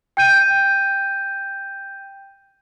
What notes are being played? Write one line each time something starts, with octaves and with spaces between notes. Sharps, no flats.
G5 G6 D#7